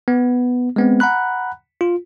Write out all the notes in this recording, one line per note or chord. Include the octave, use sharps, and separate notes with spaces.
B3
G#3 B3 C4
F#5 A#5 B5 F#6
F4